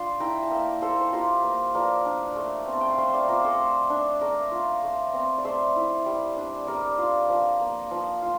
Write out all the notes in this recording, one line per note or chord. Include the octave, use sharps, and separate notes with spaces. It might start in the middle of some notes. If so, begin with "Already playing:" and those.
Already playing: D4 F4 F5 A5 C6
E4 G5 A#5
A5
A#3 E5 G5
A#3 A4 C5
C5
F4 G4 A#4
A#3
F3 A#4 D5
D4
A3
C4
A5
G5
F5
A3 C5 E5
D5 F5
F4 A#4 D5
A4 C5
A3
D4
A3 A#4 D5
F4
A3
C4
D5
A3 C5 E5
E4
G3
D4
G3 A#4 D5
F4
F3
A#3
F3
F4